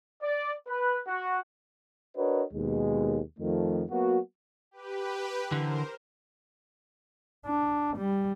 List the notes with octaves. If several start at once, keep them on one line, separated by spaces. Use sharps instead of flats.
D5
B4
F#4
D4 F#4 A#4 B4 C#5 D#5
D#2 B2 G#3
F2 D#3 F3 A3
F#3 A#3 B3 F#4
G4 B4
D3 E3 A#4 C5
D4
G3